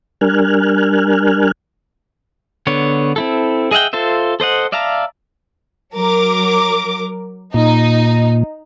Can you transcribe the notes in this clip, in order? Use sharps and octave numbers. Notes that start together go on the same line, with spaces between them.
G3 D4 A#4 G#5 F6 F#6
D3 B3 C#5
C4 E4 A4
G#4 D#5 E5 F#5 G5
F4 A4 C5 E5
A4 C5 D#5 F#5
D5 E5 F5 A5 A#5
F#3 A#4 D6
A#2 D#4